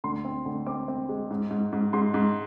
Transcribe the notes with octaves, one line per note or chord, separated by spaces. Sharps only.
D2 C6
C4
D2
C4 D6
C4
G#3
G#2
G#2
G#2
G#2 C6
G#2